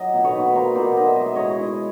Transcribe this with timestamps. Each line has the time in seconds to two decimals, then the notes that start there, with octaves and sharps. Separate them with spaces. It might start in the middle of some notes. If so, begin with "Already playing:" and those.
Already playing: F#3 D#5
0.14 B2
0.24 B4 C#5
0.35 D#4
0.45 B4
0.55 A#3 A#4 C5
0.75 B2 C5 D5
0.96 D#4 D#5
1.06 E5
1.16 G#3 D#5
1.26 E5
1.35 E4 C#5 D#5
1.59 E4